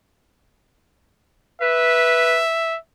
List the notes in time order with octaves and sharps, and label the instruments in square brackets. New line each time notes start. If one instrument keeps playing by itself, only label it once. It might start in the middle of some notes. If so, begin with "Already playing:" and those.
[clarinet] B4 [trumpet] E5